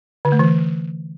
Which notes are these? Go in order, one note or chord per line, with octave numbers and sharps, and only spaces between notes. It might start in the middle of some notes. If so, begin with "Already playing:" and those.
D3
A3
E3